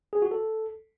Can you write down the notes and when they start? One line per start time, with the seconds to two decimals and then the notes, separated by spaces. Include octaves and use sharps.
0.13 G#4
0.22 F#4
0.31 A4